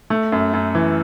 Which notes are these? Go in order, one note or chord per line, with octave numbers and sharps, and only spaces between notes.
A3
F#2
F#2
E3